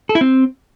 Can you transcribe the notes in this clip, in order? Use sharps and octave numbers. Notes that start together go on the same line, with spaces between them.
A4
E4
C4